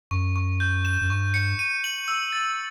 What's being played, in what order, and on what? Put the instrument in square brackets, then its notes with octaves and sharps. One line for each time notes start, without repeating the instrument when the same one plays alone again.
[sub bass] F#2 [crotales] C#6
[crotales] C#6
G6
E7
[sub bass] F#2
[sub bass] G2 [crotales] C#6
[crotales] C#7
D#7
F#7
E6
A6